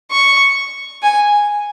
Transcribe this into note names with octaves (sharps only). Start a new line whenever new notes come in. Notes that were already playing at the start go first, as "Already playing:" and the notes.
C#6
G#5